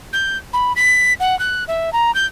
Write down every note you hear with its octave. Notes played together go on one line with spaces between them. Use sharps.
G6
B5
B6
F#5
F#6
E5
A#5
G6